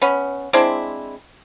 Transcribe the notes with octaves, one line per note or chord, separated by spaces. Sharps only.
B3 C#4
G#3 C4 D4 E4